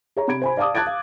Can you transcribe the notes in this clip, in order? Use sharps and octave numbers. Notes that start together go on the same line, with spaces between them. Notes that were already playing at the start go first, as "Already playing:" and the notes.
G#4 C#5 A#5
C3 B5 G#6 D7
C5 G#5 B5
D5 F5 A5 D6 D#6
A5 F#6 G#6 A6 D7
F5